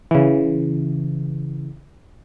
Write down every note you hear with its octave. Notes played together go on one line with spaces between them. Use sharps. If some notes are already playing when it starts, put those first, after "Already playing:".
C#3 E3